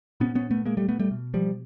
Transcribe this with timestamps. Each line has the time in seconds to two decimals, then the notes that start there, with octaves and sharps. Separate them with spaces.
0.20 A#2 B3 C#4
0.35 B3 C#4
0.51 A3 B3
0.66 G#3 A#3
0.77 G3 A3
0.89 A3 B3
0.99 G3 A3
1.11 B2
1.34 F3 G3